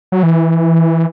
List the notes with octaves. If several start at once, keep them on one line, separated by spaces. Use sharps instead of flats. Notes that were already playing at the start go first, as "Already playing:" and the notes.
F#3
E3